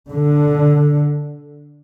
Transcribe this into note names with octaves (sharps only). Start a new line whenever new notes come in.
D3